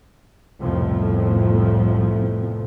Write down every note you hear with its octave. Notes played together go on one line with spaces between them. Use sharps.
C2 F2 A2 F3 A3 B3